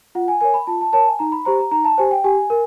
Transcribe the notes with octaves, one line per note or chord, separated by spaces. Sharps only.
F4 F#5
G#5
A#4 C#5 G#5
B5
F4 A5
A5
A#4 C#5 A5
G#5
D#4 A#5
B5
G4 C5 A#5
A#5
D#4 A#5
A5
G4 C5 G#5
G5
G4 G#5
A#4